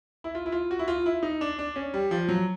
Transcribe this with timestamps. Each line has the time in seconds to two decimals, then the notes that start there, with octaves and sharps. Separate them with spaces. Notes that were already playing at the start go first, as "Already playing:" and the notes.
0.24 E4
0.35 F4
0.46 E4
0.52 F4
0.71 F#4
0.79 E4
0.88 F4
1.06 E4
1.23 D#4
1.41 D4
1.59 D4
1.76 C#4
1.94 G3
2.11 F3
2.29 F#3